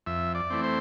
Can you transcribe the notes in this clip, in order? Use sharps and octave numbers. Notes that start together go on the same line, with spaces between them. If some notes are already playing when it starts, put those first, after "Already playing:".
F2 E5
D5
E3 A3 C4
C5